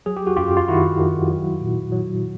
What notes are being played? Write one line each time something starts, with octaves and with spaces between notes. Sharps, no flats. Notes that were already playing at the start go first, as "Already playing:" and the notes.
F#3 G#4
G4
F#4
F#2 F4 G4
F4
D#3 E4 F#4
D#3
F#3
A#2
F#3